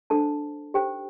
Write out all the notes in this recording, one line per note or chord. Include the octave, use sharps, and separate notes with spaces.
D4 A4 C5 A5
D#4 G4 A4 C5 G5